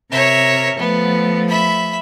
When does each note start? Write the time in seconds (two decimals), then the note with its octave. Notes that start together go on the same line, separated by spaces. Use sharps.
0.12 C3 A#4 C#5 E5
0.78 F3 A3 B3
1.49 E5 B5